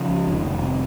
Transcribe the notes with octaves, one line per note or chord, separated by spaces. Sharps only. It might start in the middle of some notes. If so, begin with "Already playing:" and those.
Already playing: C#3 F3
C#2
F1 D#3
F1
C3